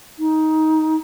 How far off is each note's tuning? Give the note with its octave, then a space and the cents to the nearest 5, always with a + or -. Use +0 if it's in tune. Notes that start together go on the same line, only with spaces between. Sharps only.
D#4 +15